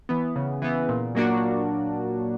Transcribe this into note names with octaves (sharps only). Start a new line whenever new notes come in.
E3 B3
C#3
E3 B3
A#2
F#3 A#3 D4 F#4